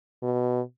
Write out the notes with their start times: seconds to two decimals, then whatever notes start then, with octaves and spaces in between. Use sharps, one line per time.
0.23 B2